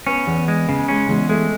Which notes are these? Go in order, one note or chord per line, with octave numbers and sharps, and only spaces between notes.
B3 C#4
E2
G#3
C#3
G#3 C#4
E2 G#3
G#3 A3